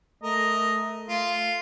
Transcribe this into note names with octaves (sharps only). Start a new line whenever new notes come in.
A3 A#4 D#5
A3 F4